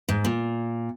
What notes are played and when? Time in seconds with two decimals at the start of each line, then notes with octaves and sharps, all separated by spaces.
0.09 G#2
0.25 A#2